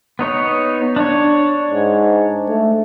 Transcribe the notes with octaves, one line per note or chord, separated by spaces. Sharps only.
B3 D#4 C#5
D4 C#5
G#2
A3